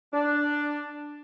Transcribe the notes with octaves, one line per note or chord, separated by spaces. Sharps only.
D4